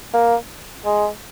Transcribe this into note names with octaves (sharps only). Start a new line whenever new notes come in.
A#3
G#3